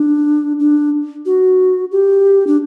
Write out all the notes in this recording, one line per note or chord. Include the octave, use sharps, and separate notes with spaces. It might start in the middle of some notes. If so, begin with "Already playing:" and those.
Already playing: D4
D4
F#4
G4
D4